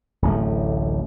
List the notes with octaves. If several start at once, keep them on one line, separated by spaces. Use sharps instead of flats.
D1 A1 A3